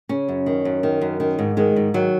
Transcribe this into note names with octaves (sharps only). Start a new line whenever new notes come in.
C#3 C#4
F#2
D#3
F#2
D#3
F#2
D#3
G#2
D#3 G#3
G#2
D#3 F#3